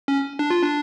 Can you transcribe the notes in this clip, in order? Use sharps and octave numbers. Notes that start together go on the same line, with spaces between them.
C#4
D4
F4
D4